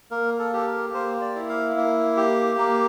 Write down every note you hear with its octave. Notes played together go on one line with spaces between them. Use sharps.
A#3 A#4
A4
G4 A4
A#4
A#3 C5
D5
E4
F5
A#3
G4
A#3